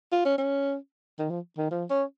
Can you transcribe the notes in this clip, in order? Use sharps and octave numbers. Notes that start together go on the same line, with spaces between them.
F4
C#4
C#4
D#3
F3
D#3
F3
C#4